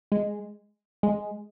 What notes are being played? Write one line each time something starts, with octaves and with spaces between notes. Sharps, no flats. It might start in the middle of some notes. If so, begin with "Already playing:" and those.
G#3
G#3